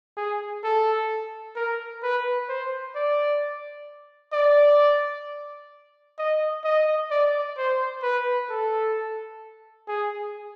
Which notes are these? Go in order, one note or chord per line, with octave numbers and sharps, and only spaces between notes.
G#4
A4
A#4
B4
C5
D5
D5
D#5
D#5
D5
C5
B4
A4
G#4